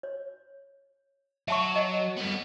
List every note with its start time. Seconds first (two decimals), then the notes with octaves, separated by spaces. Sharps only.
0.03 C#5
1.48 F#3 E5 A5 C#6
1.75 D#5
2.17 G2 B3